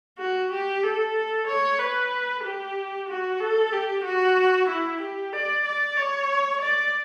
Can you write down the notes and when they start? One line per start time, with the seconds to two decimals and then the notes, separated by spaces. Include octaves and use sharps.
0.18 F#4
0.52 G4
0.83 A4
1.48 C#5
1.79 B4
2.44 G4
3.09 F#4
3.40 A4
3.73 G4
4.05 F#4
4.69 E4
5.02 G4
5.33 D5
5.65 D5
5.97 C#5
6.61 D5